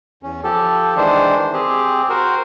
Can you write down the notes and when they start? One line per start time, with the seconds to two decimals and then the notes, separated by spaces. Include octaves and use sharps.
0.23 E2 C#4
0.44 F3 G4 A4
0.97 D#3 E3 G#3 D4 C5
1.53 C4 G4 G#4
2.10 F#4 A#4 C5